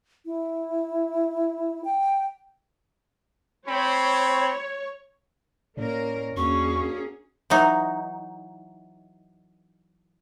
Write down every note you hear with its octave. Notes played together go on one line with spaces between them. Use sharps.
E4
G5
C4 C5 C#5 B5
A2 A#3 C#4 A#4 C#5 D5
E2 A#3 C#4 D4 F#4 G#4 C#6
E3 F#3 D#4